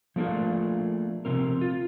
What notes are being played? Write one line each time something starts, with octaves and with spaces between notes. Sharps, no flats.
F3 A3 A#3 D4 F4 G#4
C3 F3 C4 A#4
F4